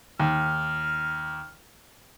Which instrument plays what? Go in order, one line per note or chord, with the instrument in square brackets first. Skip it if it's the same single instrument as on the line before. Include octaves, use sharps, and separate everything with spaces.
[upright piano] D#2 [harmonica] F6